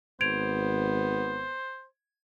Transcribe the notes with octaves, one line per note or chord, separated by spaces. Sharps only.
G#1 B3 C5 G#6 D7 F7